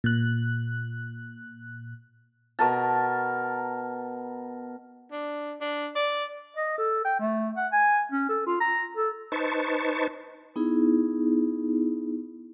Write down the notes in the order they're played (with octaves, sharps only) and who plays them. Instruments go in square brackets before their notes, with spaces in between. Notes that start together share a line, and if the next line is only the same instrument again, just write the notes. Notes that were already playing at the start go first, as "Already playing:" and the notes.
[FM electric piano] A#2 F#6
[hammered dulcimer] B2 A#4 A5
[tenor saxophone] D4
D4
D5
[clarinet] D#5
A4
G5
A3
F#5
G#5
C#4
A4
F4
A#5
A4
[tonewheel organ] D#4 B4 C5 A5 C#6
[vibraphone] B3 D#4 E4 G#4